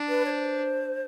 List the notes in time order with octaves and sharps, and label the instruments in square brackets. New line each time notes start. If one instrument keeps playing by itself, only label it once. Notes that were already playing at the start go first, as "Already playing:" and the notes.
Already playing: [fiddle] D4
[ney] B4
C#5
C5